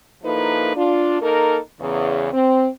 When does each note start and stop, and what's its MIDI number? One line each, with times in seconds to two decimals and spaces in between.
0.23 0.74 53
0.23 0.74 58
0.23 0.74 63
0.23 0.74 64
0.23 0.74 69
0.23 0.74 71
0.75 1.19 62
0.75 1.19 65
1.21 1.57 58
1.21 1.57 63
1.21 1.57 69
1.21 1.57 70
1.79 2.28 40
1.79 2.28 49
2.33 2.68 60